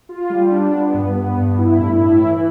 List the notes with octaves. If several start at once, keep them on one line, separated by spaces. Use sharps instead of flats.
F4
G3
D4
B3
G2
B3
G2
E4
A2
E4
E3